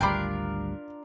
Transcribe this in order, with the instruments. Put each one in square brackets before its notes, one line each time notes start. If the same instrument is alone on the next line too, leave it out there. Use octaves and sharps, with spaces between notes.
[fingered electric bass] G#1 D2 G3 [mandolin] D4 F4 A#4 [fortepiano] G5 B5